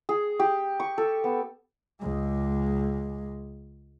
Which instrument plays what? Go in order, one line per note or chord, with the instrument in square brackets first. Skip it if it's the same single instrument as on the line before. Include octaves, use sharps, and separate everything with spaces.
[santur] G#4
G4
C#6
A4
B3
[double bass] C#2 G#3